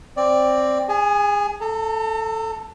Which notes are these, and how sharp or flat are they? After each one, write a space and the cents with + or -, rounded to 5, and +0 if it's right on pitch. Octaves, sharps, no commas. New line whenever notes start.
C4 +10 D5 +0
G#4 -25 G#5 +25
A4 +0 A#5 -45